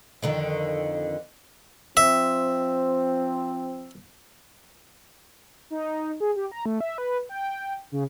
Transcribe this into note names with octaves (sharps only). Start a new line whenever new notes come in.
F2 D3 D#3
F3 C4 E5
D#4
G#4
G4
A#5
A3
E5
B4
G5
C#3